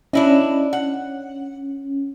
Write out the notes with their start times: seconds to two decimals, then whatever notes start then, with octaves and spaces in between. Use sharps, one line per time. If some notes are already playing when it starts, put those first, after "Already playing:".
0.13 C#4 D4 E4 D#5
0.73 F#5